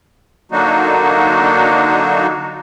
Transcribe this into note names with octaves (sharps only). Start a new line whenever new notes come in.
D3 F#3 A#3 D4 D#4 F#4